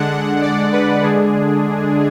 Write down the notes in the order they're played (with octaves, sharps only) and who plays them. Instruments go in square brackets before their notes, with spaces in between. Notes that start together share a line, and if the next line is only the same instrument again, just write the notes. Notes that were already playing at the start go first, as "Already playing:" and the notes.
Already playing: [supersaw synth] D3 G#3 D4 F#5
D5
B4
D3 G#3 D4 G#4